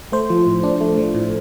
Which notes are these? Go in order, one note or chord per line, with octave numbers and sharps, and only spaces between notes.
A3 C5
F3
A2
D4
A3
F3
A2